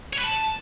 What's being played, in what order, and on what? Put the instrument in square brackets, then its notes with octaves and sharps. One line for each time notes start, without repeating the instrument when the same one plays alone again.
[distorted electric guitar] C#5
B4
A5